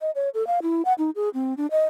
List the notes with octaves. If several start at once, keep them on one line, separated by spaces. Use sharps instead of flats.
D#5
C#5
A4
F5
E4
F#5
D#4
G#4
C4
D4
D#5